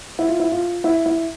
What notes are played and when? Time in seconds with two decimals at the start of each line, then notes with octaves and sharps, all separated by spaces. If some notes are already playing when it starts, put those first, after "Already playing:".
0.19 E4
0.29 F4
0.40 E4
0.52 F4
0.84 E4
1.06 E4